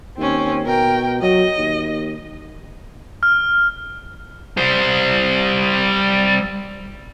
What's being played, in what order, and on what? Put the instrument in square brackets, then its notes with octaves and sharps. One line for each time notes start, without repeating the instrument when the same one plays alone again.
[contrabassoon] D#2 [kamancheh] C4 C#4
[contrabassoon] B2 [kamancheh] A#4 G5
[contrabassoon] F#3 [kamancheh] D#5
[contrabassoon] D#2
[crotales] F6
[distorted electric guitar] G3 C5